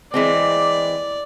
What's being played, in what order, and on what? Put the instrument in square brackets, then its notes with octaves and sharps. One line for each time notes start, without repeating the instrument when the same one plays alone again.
[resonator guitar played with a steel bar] E3 G#3 C4 [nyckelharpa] D5